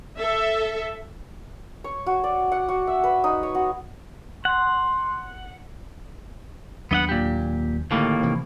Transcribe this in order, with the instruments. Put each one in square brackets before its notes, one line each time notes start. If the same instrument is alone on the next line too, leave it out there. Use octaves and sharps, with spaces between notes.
[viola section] A4 E5
[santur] C#5
F#4
D5
F#5
F#4
E5
B4
D#4
C#5
F#4
[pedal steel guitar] F#5 [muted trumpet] C6
[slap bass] D#2 F#3 D4 [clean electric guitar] B3 D#5 F#5
[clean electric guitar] A#2 G4
[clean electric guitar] D#2 A2 A#3 [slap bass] D3 A3
[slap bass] C3 E3 F3